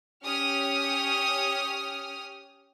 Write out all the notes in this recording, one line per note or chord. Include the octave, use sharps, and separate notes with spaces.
C#4 G4 D#6 F6